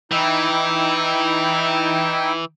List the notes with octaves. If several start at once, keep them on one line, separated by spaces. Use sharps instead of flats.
E3 D#4 E4 G5